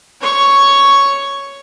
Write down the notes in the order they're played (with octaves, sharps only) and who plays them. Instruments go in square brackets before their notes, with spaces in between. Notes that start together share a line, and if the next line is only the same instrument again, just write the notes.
[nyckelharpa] C#5 C#6